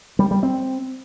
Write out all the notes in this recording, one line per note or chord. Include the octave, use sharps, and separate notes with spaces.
G3
G3
C4